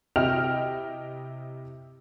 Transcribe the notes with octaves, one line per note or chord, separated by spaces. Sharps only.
C3 E4 D#5 G5 F6 F7